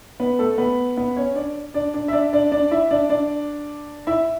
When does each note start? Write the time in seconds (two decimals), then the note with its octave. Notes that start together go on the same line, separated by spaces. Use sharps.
0.20 B3 B4
0.39 A3 A4
0.58 B3 B4
0.97 B3 B4
1.17 C#4 C#5
1.36 D4 D5
1.74 D4 D5
1.94 D4 D5
2.08 E5
2.13 D4 D5
2.33 D4 D5
2.52 D4 D5
2.71 E4 E5
2.91 D4 D5
3.09 D4 D5
4.07 E4 E5